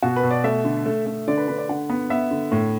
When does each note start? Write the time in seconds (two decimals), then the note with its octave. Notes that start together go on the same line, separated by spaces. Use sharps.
0.03 B2 F#4
0.16 B4
0.23 B2
0.31 D5
0.44 A3 E5
0.64 D3
0.86 A3
1.06 A3
1.27 D3 D5
1.37 B4
1.48 D3 B4
1.58 D5
1.69 D3 F#5
1.90 B3
2.10 B3 E5
2.31 D3
2.52 A2